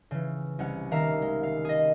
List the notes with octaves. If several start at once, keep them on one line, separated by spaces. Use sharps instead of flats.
C#3 E3
C2 C#4 F#5
D#3 A#3 A#4 E5 F5 A#5
G#3
F5
G#4 D#5